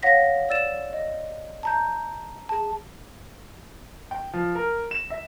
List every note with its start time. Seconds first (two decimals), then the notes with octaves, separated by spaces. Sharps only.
0.03 C#5 F5 F#5 A#6 B6
0.49 D5 E6 A6 E7
0.93 D#5
1.63 A5 A#5 G6
2.49 G#4 A5
4.11 G5
4.33 F3
4.55 A#4
4.91 E7
5.10 E5